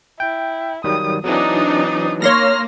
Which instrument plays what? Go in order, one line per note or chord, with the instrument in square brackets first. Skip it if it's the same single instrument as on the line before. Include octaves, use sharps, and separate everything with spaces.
[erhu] E4 [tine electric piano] G5
[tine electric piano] D#3 F#3 G3 [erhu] D#6
[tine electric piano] E3 F#3 [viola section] C4 D4 D#4 [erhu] D#6
[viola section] A#3 [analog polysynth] C#5 C6 A#6 [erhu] F6